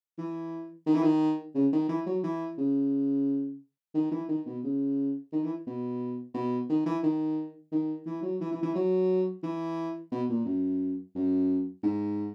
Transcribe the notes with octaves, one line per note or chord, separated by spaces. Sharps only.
E3
D#3
E3
D#3
C#3
D#3
E3
F#3
E3
C#3
D#3
E3
D#3
B2
C#3
D#3
E3
B2
B2
D#3
E3
D#3
D#3
E3
F#3
E3
E3
E3
F#3
E3
B2
A#2
F#2
F#2
G#2